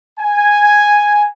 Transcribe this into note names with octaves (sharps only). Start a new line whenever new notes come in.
G#5